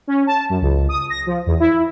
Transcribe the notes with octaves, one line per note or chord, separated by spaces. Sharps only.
C#4
A5
F#2
C#2
D#6
A#6
F3
E2
E4